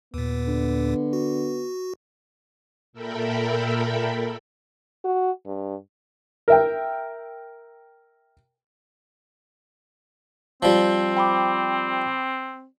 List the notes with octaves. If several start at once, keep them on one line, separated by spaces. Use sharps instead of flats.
D#2 A#2 B3
D3
F#4
A#2 A4 A#4 E5 G5 B5
F#4
G2
A#4 E5 G5
F3 G3 C4
G5 B5 D6